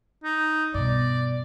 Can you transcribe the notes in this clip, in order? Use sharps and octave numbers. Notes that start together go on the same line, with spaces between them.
D#4
G2 B2 D5